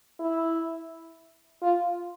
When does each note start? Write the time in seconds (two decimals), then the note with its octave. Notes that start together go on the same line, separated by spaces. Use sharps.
0.20 E4
1.62 F4